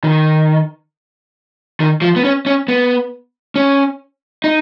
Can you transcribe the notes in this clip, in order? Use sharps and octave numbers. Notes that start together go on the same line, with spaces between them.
D#3
D#3
F3
B3
C#4
C#4
B3
C#4
D#4